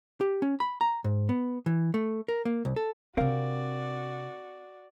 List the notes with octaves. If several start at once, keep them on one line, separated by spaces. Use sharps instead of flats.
G4
C#4
B5
A#5
G#2
B3
E3
A3
A#4
A#3
C2
A4
C3 C4 D4 F#4 A#4 D5 F5